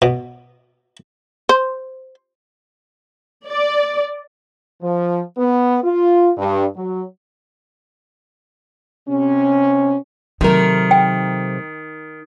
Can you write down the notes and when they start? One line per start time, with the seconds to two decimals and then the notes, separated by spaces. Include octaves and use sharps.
0.02 B2
1.49 C5
3.47 D5
4.83 F3
5.38 B3
5.83 F4
6.37 G2
6.76 F#3
9.08 C3 C#4
10.41 C3 D#3 F#3 A3 A#4
10.91 G5